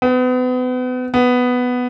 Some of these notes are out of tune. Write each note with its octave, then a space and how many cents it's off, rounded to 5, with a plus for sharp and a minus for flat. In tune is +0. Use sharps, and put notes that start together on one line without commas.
B3 +35
B3 +5